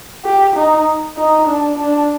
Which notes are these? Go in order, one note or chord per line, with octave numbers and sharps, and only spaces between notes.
G4
D#4
D#4
D4
D4